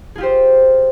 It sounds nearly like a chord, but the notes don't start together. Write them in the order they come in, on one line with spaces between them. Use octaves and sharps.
G#4 F4 G4 C5